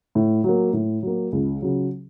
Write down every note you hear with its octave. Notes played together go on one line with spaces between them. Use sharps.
A2
F#3 A#3
A2
F#3 A#3
C#2
C#3 F#3